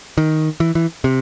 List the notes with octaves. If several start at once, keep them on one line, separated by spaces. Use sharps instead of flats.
D#3
E3
E3
C3